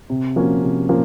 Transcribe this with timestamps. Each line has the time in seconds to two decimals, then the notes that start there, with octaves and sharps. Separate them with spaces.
0.10 C3
0.36 F3 A#3 C#4 F#4
0.63 C3
0.89 F3 A#3 C#4